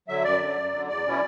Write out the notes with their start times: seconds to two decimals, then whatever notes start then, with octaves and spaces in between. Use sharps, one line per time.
0.08 D3 F#3 E5
0.24 F#2 D5
0.40 D3 F#3
0.57 F#2
0.73 D3 F#3
0.88 E2 D5
1.05 B2 F#3 C#4 E4